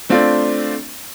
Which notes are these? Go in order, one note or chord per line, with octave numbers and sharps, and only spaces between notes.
A3 C4 D4 F4 D5